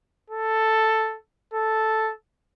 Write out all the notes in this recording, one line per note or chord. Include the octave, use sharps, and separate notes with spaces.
A4
A4